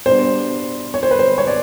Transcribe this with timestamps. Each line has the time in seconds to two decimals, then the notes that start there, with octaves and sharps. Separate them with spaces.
0.06 B2 G3 B3 D4 C5
0.94 C#5
1.03 C5
1.11 B4
1.19 C5
1.38 C#5
1.47 D5